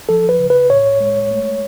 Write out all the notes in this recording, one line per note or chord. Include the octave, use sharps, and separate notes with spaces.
F3 A4
B4
C#3
B4
A2 C#5
G#3
A3